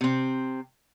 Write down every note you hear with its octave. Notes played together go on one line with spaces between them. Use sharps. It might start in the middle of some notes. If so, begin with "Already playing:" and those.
C3 C4